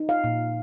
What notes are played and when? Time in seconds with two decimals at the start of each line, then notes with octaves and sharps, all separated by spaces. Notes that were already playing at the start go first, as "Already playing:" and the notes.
Already playing: D#4
0.09 F5
0.24 A#2